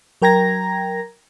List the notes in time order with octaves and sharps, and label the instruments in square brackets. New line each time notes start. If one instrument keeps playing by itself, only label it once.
[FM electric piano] F#3 A#4 G5 A#5 G#6 A#6